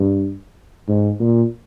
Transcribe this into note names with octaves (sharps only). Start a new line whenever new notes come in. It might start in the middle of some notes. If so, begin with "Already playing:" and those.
Already playing: G2
G#2
A#2